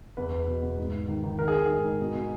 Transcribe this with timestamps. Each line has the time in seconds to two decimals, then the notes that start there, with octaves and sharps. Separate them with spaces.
0.17 E2 B4
0.32 E2
0.47 B2
0.63 E2
0.78 G#2
0.93 G#2
1.08 D#3
1.23 D#3
1.38 D#3 A#4
1.48 G#4
1.54 D#3
1.66 G#2 G#4
1.84 G#2
2.00 B2
2.14 B2